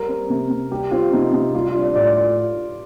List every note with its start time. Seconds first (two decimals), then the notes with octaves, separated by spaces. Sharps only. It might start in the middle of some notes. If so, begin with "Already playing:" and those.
Already playing: G3 A#4
0.09 C4
0.30 C3
0.50 C3
0.71 G3 G4
0.91 C4 F4
1.12 C3 D#4
1.33 C3
1.55 G3 F4
1.68 F4
1.74 D4
1.81 D5
1.96 A2 D5
2.16 F4